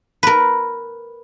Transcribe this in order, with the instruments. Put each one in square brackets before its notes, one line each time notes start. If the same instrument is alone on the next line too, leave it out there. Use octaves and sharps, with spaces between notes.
[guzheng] A#4 B4